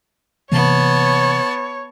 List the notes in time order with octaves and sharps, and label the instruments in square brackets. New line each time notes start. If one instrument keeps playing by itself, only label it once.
[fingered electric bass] C3 E3 A#3 [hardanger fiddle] B3 A5 [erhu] C#5